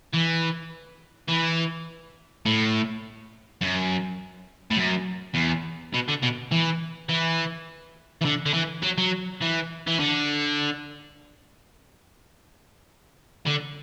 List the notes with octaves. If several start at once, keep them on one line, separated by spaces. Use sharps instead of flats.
E3
E3
A2
F#2
A2
F#2
E2
B2
D3
B2
E3
E3
E3
D3
D3
E3
F#3
F#3
E3
E3
D3
D3